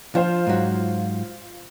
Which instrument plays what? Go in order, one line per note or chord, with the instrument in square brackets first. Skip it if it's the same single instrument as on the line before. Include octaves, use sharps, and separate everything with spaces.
[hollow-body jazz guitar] F3 [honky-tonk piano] F4 C5 F5
[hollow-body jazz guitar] G#2 F#3